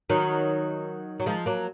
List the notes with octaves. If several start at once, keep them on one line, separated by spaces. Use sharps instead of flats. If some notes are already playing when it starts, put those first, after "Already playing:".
D#3 F#3
F#3
F3 G#3
F#3 A#3